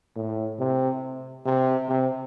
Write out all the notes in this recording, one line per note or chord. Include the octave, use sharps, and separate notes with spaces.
A2
C3
C3
C3